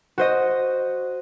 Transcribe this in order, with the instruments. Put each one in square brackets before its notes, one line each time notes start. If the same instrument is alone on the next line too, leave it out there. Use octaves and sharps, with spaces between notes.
[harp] F#4 C5 D#5